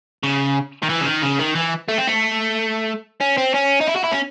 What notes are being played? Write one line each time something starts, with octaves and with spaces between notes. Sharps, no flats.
C#3
D#3
E3
C#3
D#3
C#3
D#3
E3
A3
C4
A3
C#4
C4
C#4
D#4
E4
F#4
E4
C#4